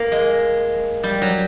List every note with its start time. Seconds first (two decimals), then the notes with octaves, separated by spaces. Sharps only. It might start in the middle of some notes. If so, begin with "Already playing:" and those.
Already playing: A#3
0.12 G#3
1.03 G3
1.22 F#3